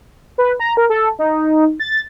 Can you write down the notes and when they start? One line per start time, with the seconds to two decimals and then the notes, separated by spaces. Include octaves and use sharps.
0.38 B4
0.60 A#5
0.77 A#4
0.90 A4
1.19 D#4
1.80 A6